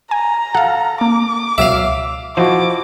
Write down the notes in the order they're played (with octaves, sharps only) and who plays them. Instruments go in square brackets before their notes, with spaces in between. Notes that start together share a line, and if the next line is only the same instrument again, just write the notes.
[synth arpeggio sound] G#5 [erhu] A#5
[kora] A4 [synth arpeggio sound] F5 F#5
[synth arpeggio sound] A#3 [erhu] D6
[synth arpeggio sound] C#2 B2 F#3 [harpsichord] E5 F5
[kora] F3 E4 F#4 [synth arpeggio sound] C5 D#5 [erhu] D6